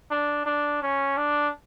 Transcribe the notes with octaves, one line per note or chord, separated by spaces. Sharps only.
D4
D4
C#4
D4